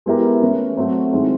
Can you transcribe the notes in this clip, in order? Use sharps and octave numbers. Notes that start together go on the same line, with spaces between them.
G#3 B3 E4 G4 A#4
E3 A3 C#4
F#3 A3 C4
D#3 G#3 C4 E4 G#4